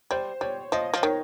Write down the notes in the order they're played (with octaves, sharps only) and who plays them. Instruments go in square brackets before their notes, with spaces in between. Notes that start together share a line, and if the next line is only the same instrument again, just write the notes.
[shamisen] G3 [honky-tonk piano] C5
[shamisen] G3 [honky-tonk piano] C#5
[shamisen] F3 [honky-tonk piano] D#5
[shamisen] F3
[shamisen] D#3 [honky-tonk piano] C#5